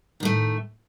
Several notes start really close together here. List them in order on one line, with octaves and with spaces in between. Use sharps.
D#3 A2 A3